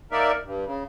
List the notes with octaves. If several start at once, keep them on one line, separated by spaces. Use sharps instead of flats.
A#3 D#4 A#4 D5 E5
G2
C#3